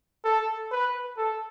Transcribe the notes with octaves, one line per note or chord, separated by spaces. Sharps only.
A4
B4
A4